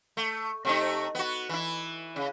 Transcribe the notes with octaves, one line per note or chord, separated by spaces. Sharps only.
A3
C3 A3 D#4
B3 F#4
E3 E4
C#3